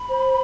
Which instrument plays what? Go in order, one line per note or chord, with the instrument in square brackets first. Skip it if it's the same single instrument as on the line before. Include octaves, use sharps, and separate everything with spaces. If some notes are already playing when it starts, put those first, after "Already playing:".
Already playing: [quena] B5
[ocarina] C5